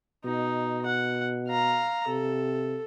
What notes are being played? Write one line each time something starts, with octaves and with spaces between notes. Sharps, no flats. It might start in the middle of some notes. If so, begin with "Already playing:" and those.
B2 D#4
F#5
F5 A#5
C3 A4